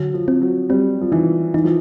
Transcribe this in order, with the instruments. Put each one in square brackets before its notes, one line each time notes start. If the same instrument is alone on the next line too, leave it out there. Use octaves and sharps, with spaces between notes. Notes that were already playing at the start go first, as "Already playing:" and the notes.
Already playing: [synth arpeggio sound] D3 [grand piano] F#3
[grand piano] F3
[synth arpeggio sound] C4
[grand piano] F#3
[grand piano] G3 [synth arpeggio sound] C4
[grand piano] F3
[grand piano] E3 [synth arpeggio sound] D#4
[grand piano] E3 [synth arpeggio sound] D#4
[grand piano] F3